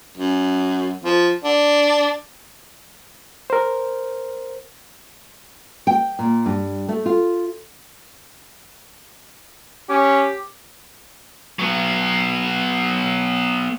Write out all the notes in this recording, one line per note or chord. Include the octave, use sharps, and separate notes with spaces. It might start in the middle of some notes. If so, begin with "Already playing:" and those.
F#2
F3
D4
A#4 C5
G5
A#2
G2
A3
F4
C#4 G4
F#3 B3